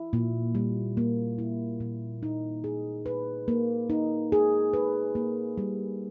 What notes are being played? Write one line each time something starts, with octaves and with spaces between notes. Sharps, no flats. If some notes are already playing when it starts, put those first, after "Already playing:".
Already playing: E4
A#2
G3
A#3
E4
A#2
D#4
G#4
B4
A#3
D#4
G#4
B4
A#3
G3